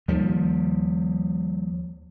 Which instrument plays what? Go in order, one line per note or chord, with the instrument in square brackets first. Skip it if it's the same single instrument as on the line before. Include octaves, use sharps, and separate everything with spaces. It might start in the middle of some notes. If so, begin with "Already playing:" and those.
[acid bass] D#2 [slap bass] F3 G3